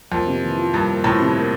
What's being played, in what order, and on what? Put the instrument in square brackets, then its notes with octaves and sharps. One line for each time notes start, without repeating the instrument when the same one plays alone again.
[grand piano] F2 [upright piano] A#3
[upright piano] C3
E3
F4
[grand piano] G2 [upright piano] A#3
[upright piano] A#3
[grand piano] A2 [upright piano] E3
[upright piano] C3
A#3